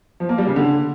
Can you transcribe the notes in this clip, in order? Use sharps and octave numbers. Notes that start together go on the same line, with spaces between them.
F3
A#3
G3
C#3
D3